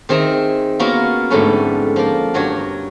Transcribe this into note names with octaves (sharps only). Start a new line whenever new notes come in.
D#3 C4 G#4 E5 A#5
A#3 B3 C#4 F4 F#4 A#4
F2 G#2 D3 A3 C#4 B4
F3 A#3
G2 F#3 F#4 C#5